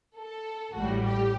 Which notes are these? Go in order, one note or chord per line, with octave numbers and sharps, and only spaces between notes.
A4
A1 A2 G3 F#4
G4